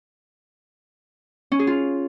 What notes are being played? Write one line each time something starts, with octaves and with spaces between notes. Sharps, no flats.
C#4
G#4
F4